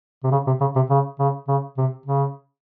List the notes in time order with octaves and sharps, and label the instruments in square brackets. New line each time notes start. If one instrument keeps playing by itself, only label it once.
[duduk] C3
C#3
C3
C#3
C3
C#3
C#3
C#3
C3
C#3